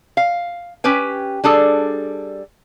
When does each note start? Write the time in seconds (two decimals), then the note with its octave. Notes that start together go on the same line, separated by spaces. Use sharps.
0.17 F5
0.84 C#4 G4 B4 G5
1.44 G3 D4 G#4 A4